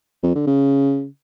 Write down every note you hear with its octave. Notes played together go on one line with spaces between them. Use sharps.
F2
D3
C#3